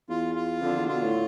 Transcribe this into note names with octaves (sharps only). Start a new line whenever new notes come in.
E2 F4
F4
F2 D3
E2
B2 F4
A2